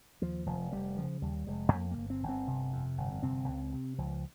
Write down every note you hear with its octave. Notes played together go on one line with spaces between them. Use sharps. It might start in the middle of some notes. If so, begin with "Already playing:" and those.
D#2 F3
F1 F3
F1 G3
C#3 F3
D#2 G3
F1 G#3
F2 A#3
A#3
G1
C4
G1
C4
C3
F2
G1
C3 C4
C#2
C3
C#2 F3